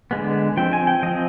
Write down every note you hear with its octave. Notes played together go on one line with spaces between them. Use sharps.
D3 G#3 B3
F3 C4 G5
G#5
G5
F3 C4 D#5